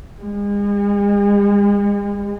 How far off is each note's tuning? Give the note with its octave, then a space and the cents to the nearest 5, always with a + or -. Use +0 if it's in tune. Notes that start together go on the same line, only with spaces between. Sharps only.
G#3 -40